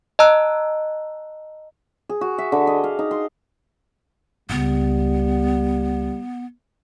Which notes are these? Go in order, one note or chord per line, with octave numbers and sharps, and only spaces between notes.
D#5 A5 A#5 E6 F#6
G#4
F#4
E5
D3
D#5
F5
D#4
C6
C#2 G3 B3